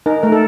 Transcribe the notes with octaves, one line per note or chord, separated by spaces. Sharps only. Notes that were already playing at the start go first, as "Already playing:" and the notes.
D#4 A#4
A3 A#4
A4